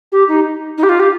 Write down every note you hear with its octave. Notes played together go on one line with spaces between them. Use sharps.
G4
D#4
D#4
G4
F4
G4